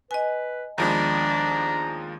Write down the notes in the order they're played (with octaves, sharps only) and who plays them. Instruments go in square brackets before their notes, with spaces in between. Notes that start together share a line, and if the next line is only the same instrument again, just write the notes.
[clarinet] B4 [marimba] D#5 G#5
[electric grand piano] D#2 F3 G#3 [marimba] D#3 B3 [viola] D4 [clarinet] A#5